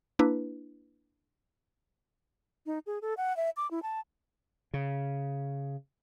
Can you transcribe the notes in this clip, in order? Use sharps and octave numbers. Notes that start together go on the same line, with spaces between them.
A#3 D4 E4 B4
D#4
G#4
A4
F#5
E5
D6
E4
A5
C#3